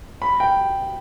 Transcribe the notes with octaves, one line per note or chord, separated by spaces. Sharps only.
B5
G5